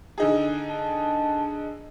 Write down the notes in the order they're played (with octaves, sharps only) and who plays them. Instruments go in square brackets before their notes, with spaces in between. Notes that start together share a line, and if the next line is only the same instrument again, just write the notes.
[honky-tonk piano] D3 D#4 G#4
[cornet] A5